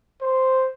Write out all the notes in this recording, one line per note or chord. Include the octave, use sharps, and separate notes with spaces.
C5